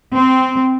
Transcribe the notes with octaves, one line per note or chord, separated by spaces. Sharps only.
C4